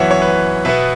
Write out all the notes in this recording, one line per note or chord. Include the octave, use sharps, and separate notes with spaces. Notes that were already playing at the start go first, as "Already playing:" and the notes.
Already playing: F#2 E3 B3 C#5 E5 F#5
C#5
B4
B2 B3 B4 E5